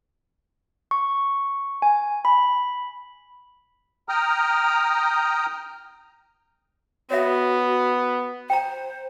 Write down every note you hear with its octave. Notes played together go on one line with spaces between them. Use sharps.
C#6
G#5
B5
G5 A#5 D#6 F6
B3 F#4 C#5 E5
C5 G5 A#5